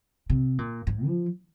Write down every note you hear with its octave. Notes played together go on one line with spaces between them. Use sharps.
C3
A#2
G#2
F3